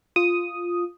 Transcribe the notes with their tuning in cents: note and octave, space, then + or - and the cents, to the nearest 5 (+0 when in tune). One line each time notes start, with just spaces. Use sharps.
F4 +0 D#6 +0